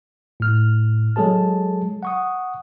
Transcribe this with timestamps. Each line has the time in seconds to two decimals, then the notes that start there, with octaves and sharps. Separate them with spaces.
0.40 A2 F6
1.16 F#3 G#3 G#4 A4 A5
2.03 F#5 C#6 D#6